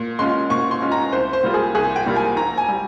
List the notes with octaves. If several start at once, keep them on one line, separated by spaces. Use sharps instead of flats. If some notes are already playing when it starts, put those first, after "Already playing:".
Already playing: A#2
G#3 C#4 F4 C6
A#2 C#6
C6
G#3 C#4 F4
A#5
C2 C5
C5
A#2 G3 A#3 F4
G#4
C2 G#4
G5
A#2 G3 A#3 F4
G#5
A#1 A#5
G#5
G3